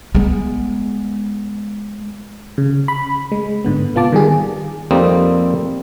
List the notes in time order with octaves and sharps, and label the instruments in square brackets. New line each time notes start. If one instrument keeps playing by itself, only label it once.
[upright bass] G#3 B3
[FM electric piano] C#3
B5
G#3
G#2 D3 B3
C3 B3 F4 A5 D6
D#3 G3 G#4
[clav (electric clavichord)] F2 G3 A#3 C4 D#4